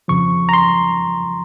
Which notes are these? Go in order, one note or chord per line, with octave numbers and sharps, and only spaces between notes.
F2 C#3 F3 C#6
A#5
C6